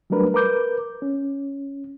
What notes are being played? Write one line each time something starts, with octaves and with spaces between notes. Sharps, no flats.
F#3 G3 A3 D4 A#4 B4
A#4 B4 D6 G6
C#4